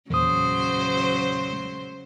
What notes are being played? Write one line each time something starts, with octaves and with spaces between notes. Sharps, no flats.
E2 A#2 C#3 F#3 C5 D#6